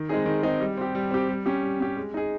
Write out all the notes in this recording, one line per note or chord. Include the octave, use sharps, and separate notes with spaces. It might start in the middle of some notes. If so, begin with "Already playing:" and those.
Already playing: D#3
G#3 C4 D#4 G#4
D#3
G#3 C4 D#4 G#4
G3
C4 G4
G3
C4 G4
G3
C#4 G4
G3
C#4 G4
G#3
D#4 G#4